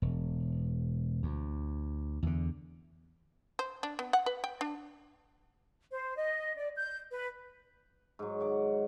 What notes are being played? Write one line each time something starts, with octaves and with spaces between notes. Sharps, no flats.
E1
D2
E2 D3
C5
D4
B3
F#5
B4
G5
D4
C5
D#5
D5
G6
B4
G#2 F#3
D#3 F#5 D6